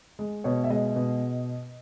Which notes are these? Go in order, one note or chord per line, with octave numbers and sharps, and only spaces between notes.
G#3
B2 C#5
E5
G#3 D#5
B2